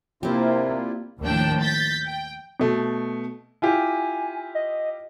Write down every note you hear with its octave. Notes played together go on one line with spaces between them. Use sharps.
C3 A#3 C4 D4 E4 F4 G4
D#2 A2 F3 D4 G5 A5
G6 A6 B6
G5
B2 A3
E4 F4 G4 G#5
D#5